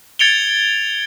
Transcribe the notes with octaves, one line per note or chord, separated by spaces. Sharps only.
G#6 A6 C#7 D7 F7 G7